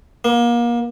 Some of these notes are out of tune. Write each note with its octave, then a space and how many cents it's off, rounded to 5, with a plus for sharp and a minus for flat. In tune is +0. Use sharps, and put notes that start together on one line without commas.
A#3 +30